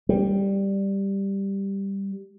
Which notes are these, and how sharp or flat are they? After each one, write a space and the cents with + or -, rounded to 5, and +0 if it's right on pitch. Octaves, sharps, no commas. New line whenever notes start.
G3 +5